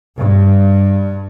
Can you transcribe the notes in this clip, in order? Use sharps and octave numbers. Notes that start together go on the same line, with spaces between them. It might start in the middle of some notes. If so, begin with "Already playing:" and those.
G2